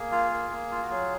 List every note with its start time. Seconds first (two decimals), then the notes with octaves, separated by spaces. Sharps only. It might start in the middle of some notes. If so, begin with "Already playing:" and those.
Already playing: A#3 G#4
0.12 F4
0.31 A#3
0.50 A#3
0.71 F4
0.83 F#4
0.90 F#3 G#4